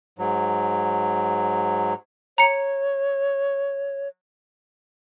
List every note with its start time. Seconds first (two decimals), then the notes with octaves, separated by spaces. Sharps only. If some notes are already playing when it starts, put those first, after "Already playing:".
0.19 G#2 F#3
2.38 C#5 A#5 C#7